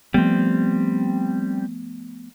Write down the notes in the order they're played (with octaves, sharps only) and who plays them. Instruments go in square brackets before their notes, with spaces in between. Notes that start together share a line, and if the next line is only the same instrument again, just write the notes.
[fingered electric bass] F3 A3 B3 [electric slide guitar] G3 C4